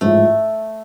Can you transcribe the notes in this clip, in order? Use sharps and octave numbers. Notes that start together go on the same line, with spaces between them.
A1 G#2 F3 A3